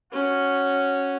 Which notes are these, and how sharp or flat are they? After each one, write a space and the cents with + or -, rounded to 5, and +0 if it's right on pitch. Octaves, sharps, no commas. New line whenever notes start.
C#4 +0 F#4 +0